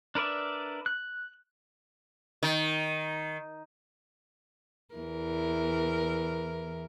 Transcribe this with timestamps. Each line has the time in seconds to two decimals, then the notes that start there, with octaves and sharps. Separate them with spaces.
0.15 D4 A#4 B4 D5 E5
0.86 F#6
2.43 D#3
4.95 E2 E3 A#4